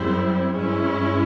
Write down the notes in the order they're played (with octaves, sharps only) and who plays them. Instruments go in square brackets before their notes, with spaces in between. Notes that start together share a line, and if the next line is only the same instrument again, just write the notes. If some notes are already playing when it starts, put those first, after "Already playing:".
Already playing: [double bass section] F#2 [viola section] G3 C4 E4 G#4 C5
[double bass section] G2 [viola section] G#3 C#4 E4